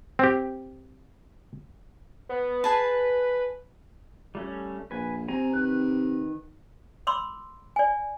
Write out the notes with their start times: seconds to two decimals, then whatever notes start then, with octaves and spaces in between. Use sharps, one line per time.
0.19 C4 G4
2.29 B3
2.64 G#4 B4 A5
4.35 G3 A3 C#4
4.91 A#1 B4 G#5
5.28 C3 C4 G#5 A#5
5.53 D#3 B4 F#6
7.07 B5 C6 D6 E6
7.76 D5 G#5